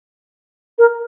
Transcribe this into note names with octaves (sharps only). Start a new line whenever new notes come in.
A#4